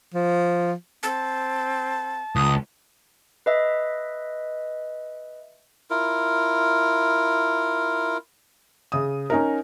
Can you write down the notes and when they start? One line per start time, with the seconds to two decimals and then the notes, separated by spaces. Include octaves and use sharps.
0.14 F3
1.03 C4 A5
2.36 C#2 D#6
3.46 B4 D#5 E5
5.90 E4 F4 A#4
8.92 C#3 D#6
9.30 C#4 D#4 A#4